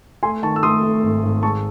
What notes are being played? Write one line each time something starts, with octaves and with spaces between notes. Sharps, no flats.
A3 G#5 C6
D#3 A5 C#6
E6
A3 C6 D#6
A3
G#1
G#1
G#3 A5 C#6